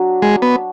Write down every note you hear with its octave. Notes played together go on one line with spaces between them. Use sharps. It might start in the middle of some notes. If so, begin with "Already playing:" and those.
Already playing: F#3 D4
G#3
B3